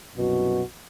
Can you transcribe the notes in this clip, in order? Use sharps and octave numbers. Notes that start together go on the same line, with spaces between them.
C2 F#2 B2 F#4